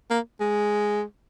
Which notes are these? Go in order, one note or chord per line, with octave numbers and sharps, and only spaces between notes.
A#3
G#3